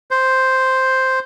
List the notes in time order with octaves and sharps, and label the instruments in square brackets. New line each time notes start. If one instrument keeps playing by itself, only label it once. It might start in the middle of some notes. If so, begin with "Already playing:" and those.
[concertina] C5